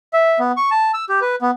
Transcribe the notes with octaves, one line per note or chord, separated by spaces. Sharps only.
E5
B3
C#6
A5
E6
G4
B4
B3